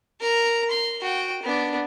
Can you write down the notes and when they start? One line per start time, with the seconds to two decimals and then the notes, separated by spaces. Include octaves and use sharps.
0.21 A#4 A#5
0.71 C6
1.01 F#4 G5
1.43 B3 D4